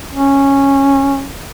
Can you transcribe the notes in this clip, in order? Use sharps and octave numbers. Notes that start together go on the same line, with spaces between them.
C#4